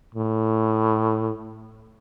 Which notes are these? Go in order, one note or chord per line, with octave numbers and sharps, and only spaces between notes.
A2